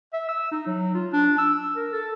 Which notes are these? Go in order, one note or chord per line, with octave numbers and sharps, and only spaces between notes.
E5
E6
D#4
F#3
F4
D4
E6
A#4
A4